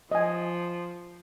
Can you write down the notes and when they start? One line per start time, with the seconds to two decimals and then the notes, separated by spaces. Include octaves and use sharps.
0.11 F3 D#5 G#5